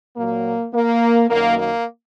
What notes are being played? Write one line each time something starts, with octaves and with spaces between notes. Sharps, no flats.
A#2 F#3 A#3
A#3
F#2 D#3 F#3 A#3
A#3